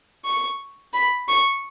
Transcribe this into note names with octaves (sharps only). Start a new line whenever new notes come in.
C#6
B5
C#6